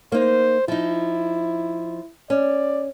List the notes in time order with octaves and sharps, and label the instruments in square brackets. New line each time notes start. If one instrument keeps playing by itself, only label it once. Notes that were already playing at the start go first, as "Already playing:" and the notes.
[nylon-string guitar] A#3 D#4 [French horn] C5
[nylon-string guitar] F3 D#4 [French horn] E4
[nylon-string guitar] C#4 [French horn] D5